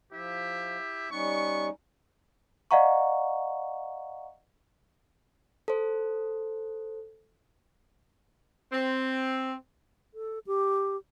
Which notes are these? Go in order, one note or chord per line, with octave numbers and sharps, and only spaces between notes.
F3 E4 G4 E5
G3 B3 C#4 D#4 C#6
D5 D#5 F5 F#5 A#5 C#6
A4 C5
C4
A4
G4